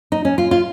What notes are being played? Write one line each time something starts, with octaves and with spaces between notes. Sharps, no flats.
D#4
C#4
F4
F4